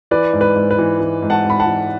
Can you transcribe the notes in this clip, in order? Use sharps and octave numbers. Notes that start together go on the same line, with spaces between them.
E3 B4 D5
G#2
B4
G#2
B4
E3
E3
G#2
F#5 A5
G#2
B5
F#5 A5
E3